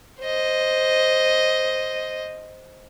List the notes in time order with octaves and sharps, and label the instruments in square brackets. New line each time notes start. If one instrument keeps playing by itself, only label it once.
[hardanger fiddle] C5 D#5